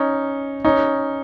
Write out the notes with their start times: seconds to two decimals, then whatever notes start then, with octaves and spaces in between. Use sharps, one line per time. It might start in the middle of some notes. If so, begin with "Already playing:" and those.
Already playing: C#4 D#4
0.65 C#4 D#4